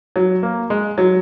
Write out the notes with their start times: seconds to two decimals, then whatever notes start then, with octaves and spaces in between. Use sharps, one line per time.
0.16 F#3
0.43 A#3
0.70 G#3
0.98 F#3